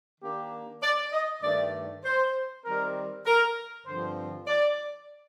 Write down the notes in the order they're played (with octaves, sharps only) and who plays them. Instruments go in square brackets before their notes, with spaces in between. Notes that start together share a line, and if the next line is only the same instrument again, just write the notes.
[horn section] D#3 A#3 D4 G4
D5
D#5
G2 D#3 A3 D5
C5
D#3 G3 C4 A#4
A#4
G2 D3 F3 C4 C5
D5